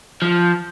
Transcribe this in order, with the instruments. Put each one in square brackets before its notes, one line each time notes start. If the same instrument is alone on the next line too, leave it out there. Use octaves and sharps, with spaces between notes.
[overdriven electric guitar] F3